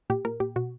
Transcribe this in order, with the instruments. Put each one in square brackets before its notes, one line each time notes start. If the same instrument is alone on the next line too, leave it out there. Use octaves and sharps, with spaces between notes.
[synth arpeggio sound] A#2 G4
A#2 A#4
A#2 G4
B2 F#4